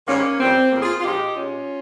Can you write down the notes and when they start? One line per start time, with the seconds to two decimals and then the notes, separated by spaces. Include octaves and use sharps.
0.08 G#2 D#3 G3 A#3 C#4
0.40 F2 D#3 G3 C4
0.72 F2 C#3 F3 A#3
0.82 F4 G#4
1.00 F4
1.04 A#2 F3 G#3 D#4 G4
1.36 A#2 G#3 C#4 F4